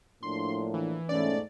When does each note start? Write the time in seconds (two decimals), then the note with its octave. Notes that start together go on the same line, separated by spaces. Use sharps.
0.23 A2 F3 A#3 D4 C6
0.74 E3
1.09 G#2 B2 A3 C#4 D5